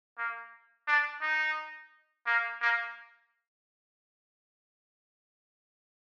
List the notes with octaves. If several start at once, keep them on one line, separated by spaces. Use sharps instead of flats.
A#3
D4
D#4
A#3
A#3